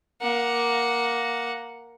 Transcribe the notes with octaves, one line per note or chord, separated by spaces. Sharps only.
A#3 F#5